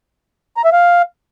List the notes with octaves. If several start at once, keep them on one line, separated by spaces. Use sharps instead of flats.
A#5
E5
F5